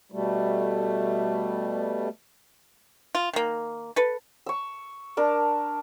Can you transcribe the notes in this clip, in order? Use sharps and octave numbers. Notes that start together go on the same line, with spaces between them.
B2 G3 A3
F4
D#3 A#3
A4 B4
C#6 E6
D4 A#4 A5